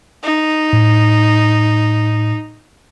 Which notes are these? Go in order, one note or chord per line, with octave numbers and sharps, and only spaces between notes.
D#4
A2